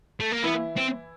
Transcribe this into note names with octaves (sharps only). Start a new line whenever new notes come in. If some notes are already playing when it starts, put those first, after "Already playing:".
A3
A#3
E3 B3 E4
C4